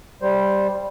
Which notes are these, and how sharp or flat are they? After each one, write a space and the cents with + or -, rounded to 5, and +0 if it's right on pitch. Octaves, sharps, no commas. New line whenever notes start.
G3 +0 C5 +0